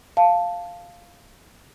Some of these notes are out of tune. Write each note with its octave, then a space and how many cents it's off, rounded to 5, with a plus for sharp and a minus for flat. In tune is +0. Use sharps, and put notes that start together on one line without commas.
F5 +0 A5 +0